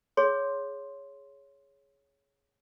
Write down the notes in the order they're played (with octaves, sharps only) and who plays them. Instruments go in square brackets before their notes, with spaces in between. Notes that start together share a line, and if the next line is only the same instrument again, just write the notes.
[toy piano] G#4 C#5 C6